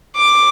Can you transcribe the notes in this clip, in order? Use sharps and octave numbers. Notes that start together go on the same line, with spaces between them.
D6